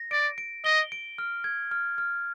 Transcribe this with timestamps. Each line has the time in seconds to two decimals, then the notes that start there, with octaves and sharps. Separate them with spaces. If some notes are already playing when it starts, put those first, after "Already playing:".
Already playing: A#6
0.11 D5 D7
0.38 D7
0.65 D#5 G7
0.92 D7
1.18 F6
1.44 G#6
1.71 F6
1.98 F6